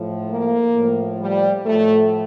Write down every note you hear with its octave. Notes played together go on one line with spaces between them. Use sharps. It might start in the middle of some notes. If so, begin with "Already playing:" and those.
Already playing: A2 F3
A#3
A2 F3
G3
A2 F3 A3